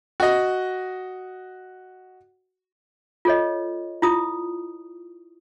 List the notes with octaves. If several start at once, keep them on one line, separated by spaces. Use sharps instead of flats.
F#4 D#5
F4 A4 C#5 D#5
E4 F4 D#6